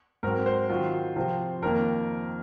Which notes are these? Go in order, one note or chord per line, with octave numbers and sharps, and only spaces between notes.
G#2 F#3 C4 A#4
C5
D#3 F#3 C4 F4
C3 F3 C4 F4
F2 D#3 A#3 A#4